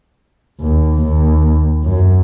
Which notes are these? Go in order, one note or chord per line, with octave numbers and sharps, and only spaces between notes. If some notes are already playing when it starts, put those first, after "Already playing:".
D#2
D#2
F#2